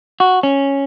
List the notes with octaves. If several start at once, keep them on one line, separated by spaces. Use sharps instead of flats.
F#4
C#4